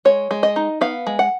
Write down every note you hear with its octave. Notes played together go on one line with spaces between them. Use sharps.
G#3 C#5
G#3
D#5
D#4
B3 F5
G#3
F#5